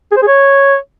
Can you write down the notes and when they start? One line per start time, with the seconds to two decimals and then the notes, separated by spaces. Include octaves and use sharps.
0.12 G#4
0.17 C5
0.22 G#4
0.28 C#5